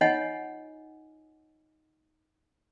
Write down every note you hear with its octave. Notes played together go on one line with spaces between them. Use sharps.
D#4 F4 C#5 D#5 F#5 G#5